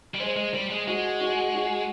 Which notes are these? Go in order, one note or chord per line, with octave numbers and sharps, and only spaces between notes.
G3
G#3 C5
G#3
G3 C5
G#3
G#3 F#4
F#4
F#4